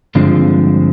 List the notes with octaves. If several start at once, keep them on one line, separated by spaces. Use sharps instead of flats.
G2 D3 F3 G#3 C4